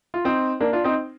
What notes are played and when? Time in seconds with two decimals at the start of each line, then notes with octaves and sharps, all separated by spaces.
0.14 F4
0.25 C4 D#4
0.60 A#3 D4
0.73 D4 F4
0.84 C4 D#4